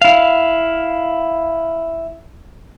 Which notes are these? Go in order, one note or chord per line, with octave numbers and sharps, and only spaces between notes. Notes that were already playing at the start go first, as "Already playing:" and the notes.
E4 F5